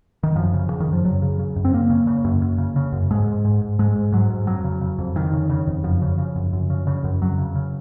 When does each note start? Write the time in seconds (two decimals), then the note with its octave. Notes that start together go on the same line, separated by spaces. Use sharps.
0.23 D#3
0.35 F#2 F3
0.54 C#3
0.70 C#3
0.80 D#3
0.87 F#2
0.93 F3
1.05 F#2 F#3
1.22 C#3
1.39 C#3
1.56 F#2
1.65 C4
1.73 F#2 A#3
1.90 C#3
2.07 C#3
2.25 F#2
2.42 F#2
2.58 C#3
2.76 C#3
2.92 F#2
3.11 G#2 G#3
3.27 G#2
3.45 G#2
3.62 G#2
3.79 G#2 G#3
3.96 G#2
4.12 G#2 F#3
4.30 G#2
4.47 F2 F#3
4.64 C#3
4.81 C#3
4.98 F2
5.16 F2 D#3
5.33 C#3
5.50 C#3
5.67 F2
5.84 F#2 F3
6.02 C#3
6.18 C#3
6.36 F#2
6.53 F#2
6.70 C#3
6.87 C#3
7.04 F#2
7.21 F2 F#3
7.38 C#3
7.55 C#3